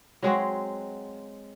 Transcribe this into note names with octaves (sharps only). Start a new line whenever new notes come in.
F#3 G#3 C4 F#4